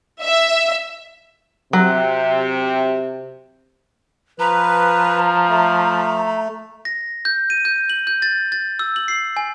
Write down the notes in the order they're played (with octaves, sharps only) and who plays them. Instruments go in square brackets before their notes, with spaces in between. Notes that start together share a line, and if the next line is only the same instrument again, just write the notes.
[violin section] E5
[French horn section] C3 [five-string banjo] F#3
[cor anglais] F3 [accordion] B4 [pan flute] A#5
[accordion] A3
[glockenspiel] A#6
G6
D#7
G6
F#7
G6
A6
A6
E6
F#7
C7
G#5